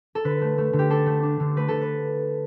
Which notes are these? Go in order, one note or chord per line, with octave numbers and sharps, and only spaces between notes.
A4
D3 B4
A3
A3
D3
G4
D4 A4
A3
D4
D3
A3 B4
D3 A4
B4